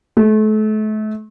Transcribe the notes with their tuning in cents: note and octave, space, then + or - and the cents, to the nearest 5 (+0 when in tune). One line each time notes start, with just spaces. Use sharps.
A3 -35